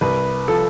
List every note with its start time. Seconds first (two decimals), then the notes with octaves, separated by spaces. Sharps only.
0.01 C2 B4
0.48 F3 A4